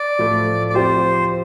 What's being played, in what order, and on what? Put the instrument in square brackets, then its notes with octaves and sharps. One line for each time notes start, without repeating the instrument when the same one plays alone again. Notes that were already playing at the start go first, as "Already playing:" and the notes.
Already playing: [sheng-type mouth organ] D5
[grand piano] A2 F3 A3
[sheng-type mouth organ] D5
[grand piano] F3 C4 G4 [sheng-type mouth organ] C5